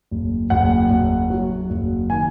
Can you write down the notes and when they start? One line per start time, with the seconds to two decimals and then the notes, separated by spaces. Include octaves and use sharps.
0.11 F#1
0.50 F#1 F#5
0.91 F#1
1.30 F#3
1.70 F#1
2.10 D#3 G#5